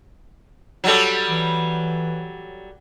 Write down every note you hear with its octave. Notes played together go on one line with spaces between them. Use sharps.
F#3 G3 A4
E3